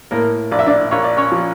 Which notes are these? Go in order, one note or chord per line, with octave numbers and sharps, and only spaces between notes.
A2 A#3 A#4
A#1 D5
E5
D4 D5
A#1 C#5
D5
C#4 C#5
F3